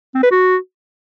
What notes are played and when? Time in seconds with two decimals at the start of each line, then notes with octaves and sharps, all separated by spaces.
0.14 C4
0.23 B4
0.31 F#4